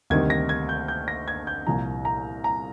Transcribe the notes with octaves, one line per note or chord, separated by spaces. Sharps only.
D2 C3 D#3 G3 G#6
A#6
G#6
G6
G6
A#6
G#6
G6
C2 A#2 F3 A#5
A#5
A#5